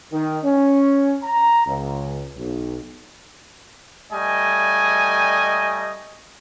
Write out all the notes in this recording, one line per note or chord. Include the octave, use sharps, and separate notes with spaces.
D#3
C#4
A#5
C#2
B1
G3 A3 D#5 G#5